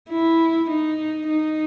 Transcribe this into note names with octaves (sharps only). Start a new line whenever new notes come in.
E4
D#4
D#4